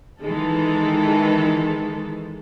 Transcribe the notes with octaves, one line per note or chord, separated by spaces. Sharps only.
D#3 E3 G#3 A4